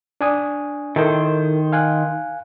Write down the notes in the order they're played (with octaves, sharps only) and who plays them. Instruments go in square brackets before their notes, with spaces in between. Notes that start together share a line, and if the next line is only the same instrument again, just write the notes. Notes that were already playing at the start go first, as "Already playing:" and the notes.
[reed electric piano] D4 G#5 D#6
[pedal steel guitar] D#3 C5 [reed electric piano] E4 A4 A#4
[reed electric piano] F5 G#5 F#6